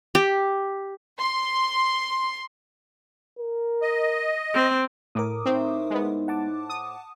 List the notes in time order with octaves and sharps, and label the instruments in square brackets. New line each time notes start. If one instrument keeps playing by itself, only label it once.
[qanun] G4
[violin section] C6
[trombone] A#4
[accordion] D#5
[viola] C4
[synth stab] A2 [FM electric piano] A#4 D6 D#6
[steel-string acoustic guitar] A2 C5 E5 [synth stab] C4 [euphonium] D#4
[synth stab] G#3 B3
[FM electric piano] F#5 A5 D6
[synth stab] D#6